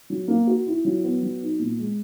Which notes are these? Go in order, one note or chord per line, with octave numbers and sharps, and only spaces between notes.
F#3
A#3
F#4
E4
F#3
B3
F#3
D#4
A#2
G#3